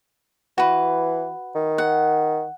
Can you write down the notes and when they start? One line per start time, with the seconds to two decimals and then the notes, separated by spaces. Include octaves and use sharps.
0.58 E3 F#4 B4
1.55 D#3
1.78 F#5